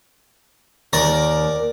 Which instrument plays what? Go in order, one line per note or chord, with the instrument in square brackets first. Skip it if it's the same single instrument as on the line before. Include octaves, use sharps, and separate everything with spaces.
[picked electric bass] D#2 [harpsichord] A#4 D5